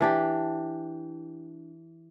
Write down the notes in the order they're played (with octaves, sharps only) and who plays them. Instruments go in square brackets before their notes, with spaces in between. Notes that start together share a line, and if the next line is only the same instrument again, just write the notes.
[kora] E3 D4 G4